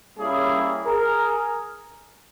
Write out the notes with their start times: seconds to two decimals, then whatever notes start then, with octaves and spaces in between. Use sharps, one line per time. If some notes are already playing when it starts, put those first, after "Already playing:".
0.18 G3 A#3 C#4 E4 G4 G#4
0.84 G#4 A#4